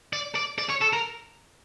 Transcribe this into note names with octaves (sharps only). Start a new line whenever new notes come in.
D5
D5
D5
C#5
A4
A#4